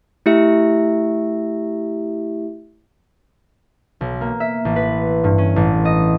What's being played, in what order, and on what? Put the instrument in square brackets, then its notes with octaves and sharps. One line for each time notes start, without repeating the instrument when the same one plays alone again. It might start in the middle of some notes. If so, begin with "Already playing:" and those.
[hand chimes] A3 E4 G4 E5
[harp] B1
A#3
E5
A1
B4
G2
C#4
A1
D#5